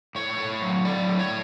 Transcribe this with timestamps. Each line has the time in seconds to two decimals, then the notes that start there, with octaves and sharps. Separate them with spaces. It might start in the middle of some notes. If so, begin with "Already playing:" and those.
0.15 A2 C#5
0.38 A2
0.62 F#3
0.85 A2 D5
1.08 A2
1.19 C#5